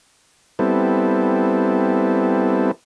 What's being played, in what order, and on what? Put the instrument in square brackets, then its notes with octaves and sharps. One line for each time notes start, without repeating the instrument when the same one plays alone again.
[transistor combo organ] G3 B3 C4 E4 A4